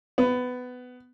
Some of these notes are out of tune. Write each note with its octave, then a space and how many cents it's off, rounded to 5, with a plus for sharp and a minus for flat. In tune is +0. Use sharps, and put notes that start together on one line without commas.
B3 +15